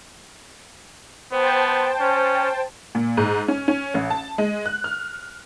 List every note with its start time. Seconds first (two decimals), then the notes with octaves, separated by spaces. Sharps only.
1.32 B3 C5 G5 A5
2.00 C#4
2.95 A#2
3.17 G#2
3.48 C#4
3.68 C#4
3.94 A1
4.10 A5
4.38 G#3
4.66 F#6
4.84 F6